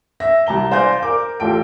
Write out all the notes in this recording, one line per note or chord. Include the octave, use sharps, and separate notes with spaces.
E5 A#6
C2 A5 A#5 G7
C5 D5 F5 G#5 G6 A#6
A#4 D6
A1 F4 A4 G5 D7